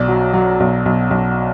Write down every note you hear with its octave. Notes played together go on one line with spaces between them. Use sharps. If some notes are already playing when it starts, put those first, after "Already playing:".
Already playing: B1 D5
F#3
F#3
B1
B1
B1